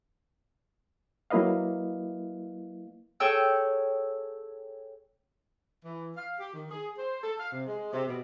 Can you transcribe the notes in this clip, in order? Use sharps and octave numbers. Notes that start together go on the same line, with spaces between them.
F#3 A#3 E4 B4 D#5 F5
G#4 A4 C#5 G5 E6 G6
E3
F5
G4
D#3
G#4
C5
A4
F5
C3
G#3
C3
B2